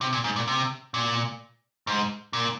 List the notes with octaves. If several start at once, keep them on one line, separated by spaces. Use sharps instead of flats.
C3
A#2
G#2
A#2
C3
A#2
G#2
A#2